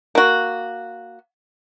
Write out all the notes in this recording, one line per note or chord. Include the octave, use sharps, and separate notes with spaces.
A#3 F#4